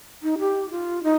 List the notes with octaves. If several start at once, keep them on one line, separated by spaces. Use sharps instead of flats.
D#4
G4
F4
D#4